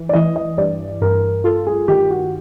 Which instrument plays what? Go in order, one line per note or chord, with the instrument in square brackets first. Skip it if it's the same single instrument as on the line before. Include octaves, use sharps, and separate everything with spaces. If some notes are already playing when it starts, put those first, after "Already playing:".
Already playing: [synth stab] E3
[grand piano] D5
[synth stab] E3 [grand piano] D#5
[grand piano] D#5
[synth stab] G2 [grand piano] D5
[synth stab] G2 [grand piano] A#4
[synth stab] F4 [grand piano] A4
[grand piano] G#4
[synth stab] D#3 [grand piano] G4
[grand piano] F#4